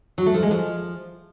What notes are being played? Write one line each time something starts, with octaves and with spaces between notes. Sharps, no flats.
F#3
A3
F3
G#3
F3